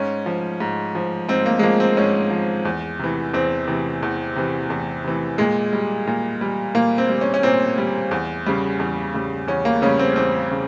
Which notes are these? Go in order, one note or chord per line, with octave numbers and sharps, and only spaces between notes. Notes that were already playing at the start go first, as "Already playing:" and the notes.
Already playing: G#2 C#4
F3
G#2
F3
G#2 C4
A#3
G#3
F3 A#3
C4
G#2 C#4
F3
E2
C3 E3
E2 C4
C3 E3
E2
C3 E3
E2
C3 E3
A#2 G#3
G3
A#2
G3
A#2 A#3
C4
G3
C#4
C#4
A#2 C4
G3
E2
C#3 G3
E2
C#3 G3
E2 C#4
A#3
C#3 G3 C#4
C4
E2 C4
C#3